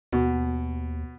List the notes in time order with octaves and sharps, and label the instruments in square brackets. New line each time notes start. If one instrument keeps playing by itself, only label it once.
[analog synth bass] D#2 [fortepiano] B2